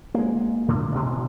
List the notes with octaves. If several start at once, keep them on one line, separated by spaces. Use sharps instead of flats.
G#3 A#3
A2 D3 A3
A1 B2